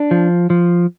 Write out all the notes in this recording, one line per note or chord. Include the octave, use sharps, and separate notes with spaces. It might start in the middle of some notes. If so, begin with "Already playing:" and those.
Already playing: D4
F3
F3